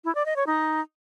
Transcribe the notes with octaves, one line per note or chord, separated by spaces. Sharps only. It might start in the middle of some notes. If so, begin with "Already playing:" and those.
E4
D5
D#5
C#5
D#4